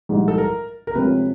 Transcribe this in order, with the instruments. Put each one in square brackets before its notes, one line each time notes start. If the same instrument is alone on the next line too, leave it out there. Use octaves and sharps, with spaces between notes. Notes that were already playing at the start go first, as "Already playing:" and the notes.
[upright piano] A#1 G#2 E3 G3
[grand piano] A4
A#4
A#4
[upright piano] D2 C3 F3 G#3 C#4 [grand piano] B4